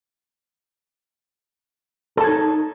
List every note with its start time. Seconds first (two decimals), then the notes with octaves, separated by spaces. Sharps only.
2.17 A4
2.21 A5
2.24 C#5
2.27 D#4